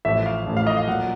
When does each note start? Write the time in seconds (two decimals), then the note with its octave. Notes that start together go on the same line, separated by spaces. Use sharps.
0.05 A1 A2 F3 E5
0.26 F5
0.46 A1 A2 F3
0.57 F5
0.67 D#5
0.77 F5
0.87 A#2 F#3 F#5